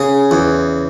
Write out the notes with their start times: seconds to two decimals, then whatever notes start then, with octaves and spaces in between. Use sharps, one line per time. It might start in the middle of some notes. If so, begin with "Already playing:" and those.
Already playing: C#3 G#4
0.31 E2